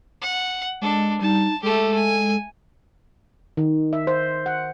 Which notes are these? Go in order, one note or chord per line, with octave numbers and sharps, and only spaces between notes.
F#5
G#3 D4 A4
G3 D#4 A5
G#3 A3 G4 A4
G#5
D#3
E5
C5
F#5